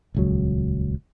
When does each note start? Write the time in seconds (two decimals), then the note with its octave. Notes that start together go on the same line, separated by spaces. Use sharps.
0.15 D#1 C#2 F#3